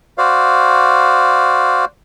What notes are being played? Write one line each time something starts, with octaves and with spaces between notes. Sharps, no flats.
F#4 C5 D5 F5